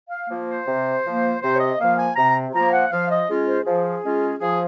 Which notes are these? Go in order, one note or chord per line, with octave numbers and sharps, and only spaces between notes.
F5
F3 A#3
C5
C3
F3 A#3
C3 C5
C#5
D#5
F3 A#3 F5
G#5
C3 A#5
F3 A#3 A#5
F#5
F3 F5
D#5
G#3 C#4 F4
C5
F3 G#4
G#3 C#4 F4
F3 G#4